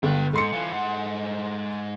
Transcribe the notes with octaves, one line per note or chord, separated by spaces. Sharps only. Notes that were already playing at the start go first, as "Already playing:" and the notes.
G1 B4 G5
G#2 A4 C6 C#7
E3 F4
G#2 F#5